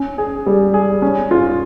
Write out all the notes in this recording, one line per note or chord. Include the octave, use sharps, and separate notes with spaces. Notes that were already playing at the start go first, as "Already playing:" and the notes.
Already playing: C#4
G#4
G3
G#4
C#4
F4